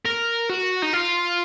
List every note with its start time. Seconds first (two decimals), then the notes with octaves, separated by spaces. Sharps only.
0.05 A#4
0.49 F#4
0.82 D#4
0.93 F4